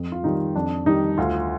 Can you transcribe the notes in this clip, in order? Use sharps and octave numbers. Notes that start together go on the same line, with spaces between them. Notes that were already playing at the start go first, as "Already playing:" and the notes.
Already playing: F2
F4
D#3 G3 D#4
F2 D4
D#3 G3 D#4
D2 F4